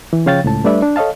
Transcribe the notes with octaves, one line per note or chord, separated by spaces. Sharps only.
E3
C#3 F3 C#5 F5 G5 A6
C#2 A2 A5
G3 A3 D4 B4 D5 E5
D4
A4 C#5 D#5 F5 A5